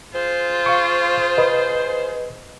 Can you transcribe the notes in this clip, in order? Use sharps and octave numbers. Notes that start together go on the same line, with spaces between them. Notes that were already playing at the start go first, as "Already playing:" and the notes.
F4 G#4 C5
F5 C#6
B4 D#5